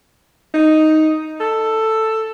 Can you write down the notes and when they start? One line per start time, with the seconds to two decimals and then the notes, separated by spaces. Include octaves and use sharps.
0.54 D#4
1.40 A4